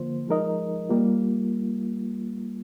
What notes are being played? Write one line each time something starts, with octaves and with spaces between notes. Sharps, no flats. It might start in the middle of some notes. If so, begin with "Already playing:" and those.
Already playing: D3 F3 A#3 F4 C5
F3 G#3 D#4 A#4 D#5
G3 A#3 F4